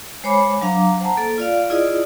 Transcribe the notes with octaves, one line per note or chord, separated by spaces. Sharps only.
G#3 C5 C#5 G#5 B5 D6
F#3 D4 F5 A#5 D6
C5 F#5 A5 A#5
A#3 A4
F4 D5 F5
E4 F4 G#4 D5 D#5 D#6